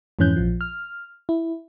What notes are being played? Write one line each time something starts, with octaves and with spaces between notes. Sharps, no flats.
F2 G#2 E3 C#4 F#6 G6
A#1 F3
F6
E4